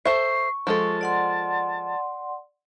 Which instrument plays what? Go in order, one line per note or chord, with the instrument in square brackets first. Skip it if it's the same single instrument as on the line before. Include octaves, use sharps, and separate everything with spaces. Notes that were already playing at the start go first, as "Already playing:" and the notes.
[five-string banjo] A4 C5 E5 [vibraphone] C#6 [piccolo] C7
[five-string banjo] F3 G#3 A4 [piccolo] A5
[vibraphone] D5 F#5 C6